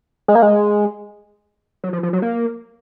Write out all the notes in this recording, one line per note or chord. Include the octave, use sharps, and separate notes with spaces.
G#3
A#3
G#3
F#3
F3
F3
F#3
A#3